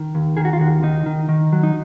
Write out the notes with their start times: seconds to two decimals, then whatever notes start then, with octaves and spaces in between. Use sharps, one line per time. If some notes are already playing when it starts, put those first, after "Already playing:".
Already playing: D#3
0.15 D#2
0.37 D#3 G#4
0.45 F#4
0.53 F4
0.60 D#2 F#4
0.83 D#3 D#4
1.06 D#3
1.29 D#3
1.53 F#3
1.63 D#4